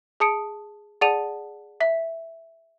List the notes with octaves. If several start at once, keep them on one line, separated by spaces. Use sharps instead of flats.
G#4 A5 D#6 C#7 D7
G#4 D5 F#5 A5 D#7 F7
E5 B6